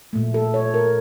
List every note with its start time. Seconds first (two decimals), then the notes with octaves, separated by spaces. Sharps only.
0.13 A#2 A3
0.34 A4
0.54 C#5
0.74 A#4